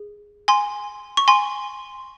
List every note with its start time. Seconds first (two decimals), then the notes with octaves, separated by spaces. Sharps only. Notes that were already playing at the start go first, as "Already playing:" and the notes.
Already playing: G#4
0.48 G#5 C6
1.17 C#6
1.28 G#5 C6